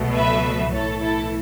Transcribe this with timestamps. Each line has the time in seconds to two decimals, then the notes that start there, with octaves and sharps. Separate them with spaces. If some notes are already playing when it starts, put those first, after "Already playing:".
Already playing: C#2 B2 F#3 A3
0.14 B4 E5
0.71 B1 A2 E3 A3 A4 C#5
1.00 E4 A4